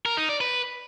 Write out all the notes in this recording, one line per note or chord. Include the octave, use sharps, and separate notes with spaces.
A#4
D#4
D5
B4